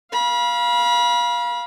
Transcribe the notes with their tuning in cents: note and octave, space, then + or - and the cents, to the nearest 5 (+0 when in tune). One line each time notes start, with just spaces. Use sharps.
F5 +0 B5 -35